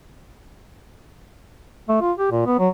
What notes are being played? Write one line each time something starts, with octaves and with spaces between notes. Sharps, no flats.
A3
F4
G4
A#2
B3
F#3